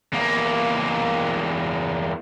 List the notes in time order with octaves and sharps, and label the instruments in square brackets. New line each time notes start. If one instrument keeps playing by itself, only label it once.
[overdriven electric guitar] E2 A#3